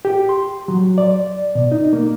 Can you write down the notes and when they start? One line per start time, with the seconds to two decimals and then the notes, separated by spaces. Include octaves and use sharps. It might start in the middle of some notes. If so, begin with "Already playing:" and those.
0.05 G4
0.29 C6
0.68 F#3
0.98 D5
1.55 B2
1.72 D#4
1.93 A#3